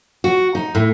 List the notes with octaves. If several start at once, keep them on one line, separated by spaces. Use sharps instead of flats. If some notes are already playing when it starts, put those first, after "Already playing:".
F#4
D#4
A2